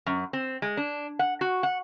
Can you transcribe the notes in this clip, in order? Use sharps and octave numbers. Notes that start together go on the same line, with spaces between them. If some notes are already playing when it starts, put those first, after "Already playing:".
F#2
C4
G#3
D4
F#5
F#4
F#5